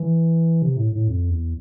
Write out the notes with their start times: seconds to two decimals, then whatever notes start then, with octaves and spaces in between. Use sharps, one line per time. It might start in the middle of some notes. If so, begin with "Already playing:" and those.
Already playing: E3
0.62 C3
0.77 A2
0.92 A2
1.08 F2
1.30 E2